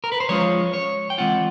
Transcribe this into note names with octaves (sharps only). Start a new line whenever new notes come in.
A#4
B4
C5
F3 G#3 C#4 F4 C#5
C#5
G5
E3 G#3 C4 F4 F#5